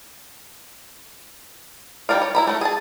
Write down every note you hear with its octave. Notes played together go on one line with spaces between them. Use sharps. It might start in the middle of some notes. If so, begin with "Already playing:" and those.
D#3 G3 A#4 D5 F5
C#5
E4 A#5 B5
F#3 A3
G#4 A5